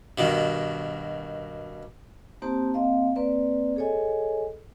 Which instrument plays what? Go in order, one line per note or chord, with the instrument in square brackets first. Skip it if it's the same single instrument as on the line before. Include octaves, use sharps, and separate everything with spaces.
[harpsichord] G2 B2 D#3
[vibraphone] A#3 C4 D#4 G4 C5 A5
A#3 C4 D#5 F5
A#3 C4 B4 D5
G#4 A4 C#5 D#5 G#5